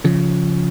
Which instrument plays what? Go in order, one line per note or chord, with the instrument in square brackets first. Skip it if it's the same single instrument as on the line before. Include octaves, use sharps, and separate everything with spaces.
[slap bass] C#3 F3